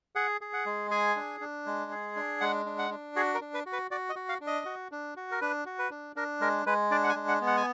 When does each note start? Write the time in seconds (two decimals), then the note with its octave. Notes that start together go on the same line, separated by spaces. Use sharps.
0.15 G#4 F#5
0.41 G#4
0.53 F#5
0.66 G#3
0.91 G#4 G#5
1.16 D4
1.41 D4
1.66 G#3
1.91 G#4
2.16 D4
2.41 G#3 F#5
2.66 D4
2.79 F#5
2.91 D4
3.16 F#4 G#4
3.34 A#4
3.41 D4
3.54 B4
3.66 F#4
3.73 B4
3.91 F#4 D5
4.09 D#5
4.15 F#4
4.29 F5
4.41 D4
4.47 D#5
4.65 F#4
4.91 D4
5.17 F#4
5.31 A#4
5.41 D4 B4
5.66 F#4
5.79 B4
5.91 D4
6.16 D4 A#4
6.40 G#3 A#4
6.66 G#3 B4
6.91 D4 D5
7.04 F#5
7.09 G#5
7.16 G#3
7.28 F#5
7.41 B3
7.47 F#5
7.57 G#5